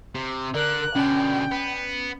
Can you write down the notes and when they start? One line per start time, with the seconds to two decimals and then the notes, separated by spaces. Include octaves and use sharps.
0.15 C3
0.54 D3 A#4 D5 F#6
0.95 B2 D3 C#4 D5 G5 G#5
1.52 B3